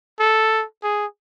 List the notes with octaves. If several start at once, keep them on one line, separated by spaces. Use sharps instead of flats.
A4
G#4